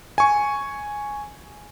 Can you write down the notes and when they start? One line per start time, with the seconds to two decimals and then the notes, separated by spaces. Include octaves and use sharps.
0.18 G#5 C#6